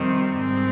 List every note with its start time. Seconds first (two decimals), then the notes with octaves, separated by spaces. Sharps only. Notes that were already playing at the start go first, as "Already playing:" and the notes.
Already playing: F2 C3 D#3 G3 C4
0.34 G#2 G3 C4